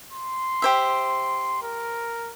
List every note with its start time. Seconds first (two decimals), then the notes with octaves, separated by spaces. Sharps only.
0.13 C6
0.62 G4 C5 E5
1.62 A#4